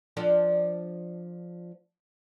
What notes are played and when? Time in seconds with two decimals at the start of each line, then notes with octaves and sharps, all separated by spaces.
0.17 F3 D4 A4